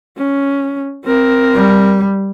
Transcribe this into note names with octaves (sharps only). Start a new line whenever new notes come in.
C#4
C4 A#4
G3